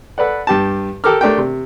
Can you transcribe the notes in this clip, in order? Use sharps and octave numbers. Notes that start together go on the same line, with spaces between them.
A4 B4 D5 F#5
G2 G4 A5
G4 A4 A#4 D6 F6
A3 D4 G4 A#4 G5
C3